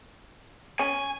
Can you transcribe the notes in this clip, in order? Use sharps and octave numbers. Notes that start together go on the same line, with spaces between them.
C#4 G#5